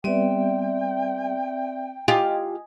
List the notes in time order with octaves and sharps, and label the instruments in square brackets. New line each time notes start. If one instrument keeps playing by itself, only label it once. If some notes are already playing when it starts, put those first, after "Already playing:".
[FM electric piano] G3 B3 [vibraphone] C4 D5 E5 [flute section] G5
[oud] F4 G4 [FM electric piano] D#5 G#5